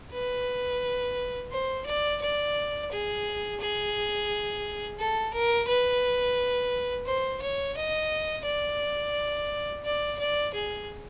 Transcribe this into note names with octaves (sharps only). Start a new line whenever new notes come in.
B4
C5
D5
D5
G#4
G#4
A4
A#4
B4
C5
C#5
D#5
D5
D5
D5
G#4